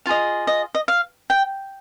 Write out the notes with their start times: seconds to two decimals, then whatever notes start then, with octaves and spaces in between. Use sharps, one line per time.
0.06 F4 G#4 D#5 F5
0.47 D#5
0.75 D#5
0.88 F5
1.30 G5